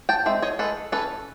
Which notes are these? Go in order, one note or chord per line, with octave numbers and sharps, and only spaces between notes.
G5 A5
G#3 C4 E5
C#5 D#5
G#3 A4 B4
C#4 A4 B4